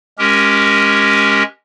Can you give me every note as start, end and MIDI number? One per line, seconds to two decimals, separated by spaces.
0.19 1.43 56
0.19 1.43 61
0.19 1.43 67
0.19 1.43 70